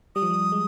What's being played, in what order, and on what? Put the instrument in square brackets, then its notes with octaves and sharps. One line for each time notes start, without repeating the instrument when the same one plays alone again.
[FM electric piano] G3 [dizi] D#6
[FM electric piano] F3
G3
G#3